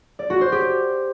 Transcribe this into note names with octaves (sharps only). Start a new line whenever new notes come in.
D5
F#4
C5
G4